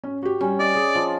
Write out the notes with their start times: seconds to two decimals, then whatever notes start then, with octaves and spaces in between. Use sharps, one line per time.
0.04 C#4
0.23 F#4 G4
0.41 G3 C#4
0.60 D5 D#5
0.75 G#4
0.95 F3